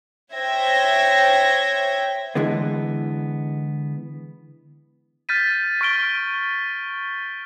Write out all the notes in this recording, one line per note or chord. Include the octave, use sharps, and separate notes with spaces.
C5 C#5 E5 G5 G#6 A#6
D3 E3 G#3 B3
F6 G6 A6 B6 D#7
C#6 F6 D7 G7